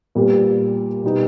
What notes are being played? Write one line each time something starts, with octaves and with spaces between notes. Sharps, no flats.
A#2 G3 B3 G4 A#4
B2 G3 B3 D#4 G4